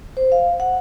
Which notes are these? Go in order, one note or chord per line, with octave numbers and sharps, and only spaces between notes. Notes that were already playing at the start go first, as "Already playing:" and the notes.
C5
F5
F#5